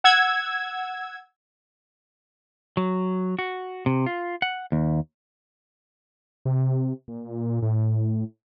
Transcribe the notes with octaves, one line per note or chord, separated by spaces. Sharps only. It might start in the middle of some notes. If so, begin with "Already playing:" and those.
F#5 E6 G#6
F#3
F#4
C3
F4
F#5
D#2
C3
A#2
A2